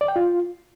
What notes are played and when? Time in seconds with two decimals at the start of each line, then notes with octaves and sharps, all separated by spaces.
0.01 D5
0.08 G5
0.16 F4